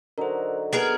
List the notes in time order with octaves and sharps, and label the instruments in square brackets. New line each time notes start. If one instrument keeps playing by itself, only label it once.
[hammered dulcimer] D3 F#3 D#4 [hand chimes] A#4 C5
[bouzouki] B3 G#4 A#4 [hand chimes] D7